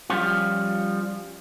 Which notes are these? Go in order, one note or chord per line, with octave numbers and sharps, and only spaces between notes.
F3 G3 C#4 F4